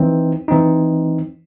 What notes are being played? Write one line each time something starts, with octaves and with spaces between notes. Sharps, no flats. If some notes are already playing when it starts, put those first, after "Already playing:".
Already playing: E3 C4 D#4
E3 C4 D#4